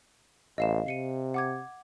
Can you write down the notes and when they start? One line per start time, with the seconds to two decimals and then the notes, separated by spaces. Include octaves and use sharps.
0.58 A1 D#5 F5 E7
0.86 C3 C7 C#7 D#7
1.34 F#5 D6 G#6